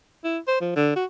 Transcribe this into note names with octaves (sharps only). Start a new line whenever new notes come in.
E4
C5
F3
D3
F#4